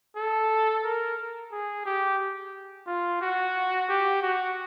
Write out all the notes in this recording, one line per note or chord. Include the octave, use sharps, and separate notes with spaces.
A4
A#4
G#4
G4
F4
F#4
G4
F#4